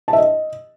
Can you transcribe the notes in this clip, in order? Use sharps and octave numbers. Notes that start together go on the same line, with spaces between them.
A5
E5
D#5